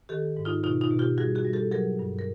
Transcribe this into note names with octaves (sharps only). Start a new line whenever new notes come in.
D#3 G4 A4
G#2
D#4 F4
B2 D#4 F4
D#4 F4
B2
F4 G4
G3 F#4 G#4
F#4 G#4
G3
G4 A4
F#3 G#4 A#4
G2
A#4